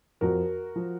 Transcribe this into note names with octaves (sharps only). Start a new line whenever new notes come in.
F2 F3 F#4 A#4
F3